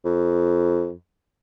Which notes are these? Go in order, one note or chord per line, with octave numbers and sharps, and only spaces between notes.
F2